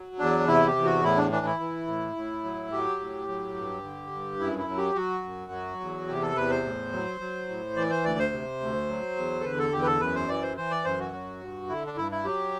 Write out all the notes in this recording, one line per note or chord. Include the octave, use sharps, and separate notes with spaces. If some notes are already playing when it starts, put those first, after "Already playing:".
Already playing: F#3
E2 D4
C3 E4
G4
E2
F#4
A2 E4
D4
E3 D4
E4
E3
A2
A2
F#3
F#3 G4
A2
F#3
G2
D3
G2
F#2 E4
E4
F#3
G4
F#3 F#4
F#2
F#3
E2
C3 G4
A4
E2 B4
C5
A2
F#3
F#3
A2
E3 D5
C5
D2 D5
C5
C3
D2
F#3
E2
A4
D3 B4
A4
E2 G4
B4
A4
F#2 B4
C5
E3 D5
C5
E3 C5
D5
F#2 C5
F#4
F#3
G2
D3 E4
D4
G2 E4
E4
F#3 G4